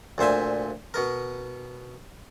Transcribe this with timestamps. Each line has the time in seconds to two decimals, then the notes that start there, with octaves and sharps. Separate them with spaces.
0.18 D2 A#2 C5 E5 G#5
0.94 B2 B3 A#4